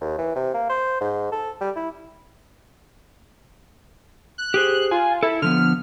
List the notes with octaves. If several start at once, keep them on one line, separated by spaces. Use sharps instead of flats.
D#2
E3
C3
A#3
C5
G#2
A4
G3
E4
F#6
G4 G#4 C5
F4 G#5
E4 A4
D3 F3 B3 F6